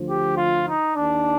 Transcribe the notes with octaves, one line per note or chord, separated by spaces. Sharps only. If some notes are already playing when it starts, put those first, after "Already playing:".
Already playing: D2 D3 F3
G4
F4
D#4
D#2 D#3 D4